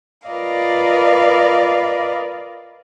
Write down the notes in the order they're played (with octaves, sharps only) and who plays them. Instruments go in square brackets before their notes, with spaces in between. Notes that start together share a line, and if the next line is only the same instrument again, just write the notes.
[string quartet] F4 A#4 B4 D5 D#5 F5